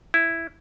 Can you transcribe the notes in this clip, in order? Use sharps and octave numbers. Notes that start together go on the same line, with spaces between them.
E4